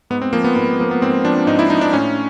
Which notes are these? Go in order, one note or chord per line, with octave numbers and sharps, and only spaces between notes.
G#2 B3
C4
F3 A#3
B3
G#2 B3
F3 A#3
B3
G#2 C4
F3 D4
G#2 D#4
E4
F3 D#4
D4
A2 C#4